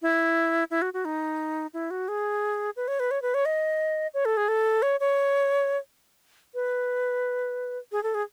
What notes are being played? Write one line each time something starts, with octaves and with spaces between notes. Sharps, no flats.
E4
E4
F#4
F#4
D#4
E4
F#4
G#4
B4
C#5
B4
C#5
B4
C#5
D#5
C#5
A4
G#4
A4
C#5
C#5
B4
G#4
A4
G#4